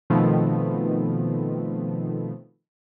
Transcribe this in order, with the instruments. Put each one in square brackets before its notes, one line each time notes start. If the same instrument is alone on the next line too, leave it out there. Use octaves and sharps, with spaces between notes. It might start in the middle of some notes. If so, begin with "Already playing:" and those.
[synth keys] B2 D#3 F3 A3 B3 C4